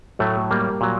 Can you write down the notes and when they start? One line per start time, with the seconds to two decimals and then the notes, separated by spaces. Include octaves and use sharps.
0.19 A2 F#3 A3
0.51 G3 A#3
0.81 A#2 F#3